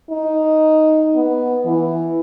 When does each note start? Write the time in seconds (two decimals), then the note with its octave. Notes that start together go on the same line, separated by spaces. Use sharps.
0.10 D#4
1.15 B3
1.66 E3